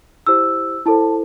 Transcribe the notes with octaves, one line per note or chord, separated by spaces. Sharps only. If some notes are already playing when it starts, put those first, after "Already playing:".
E4 G4 C5 E6
E4 A4 C5 A5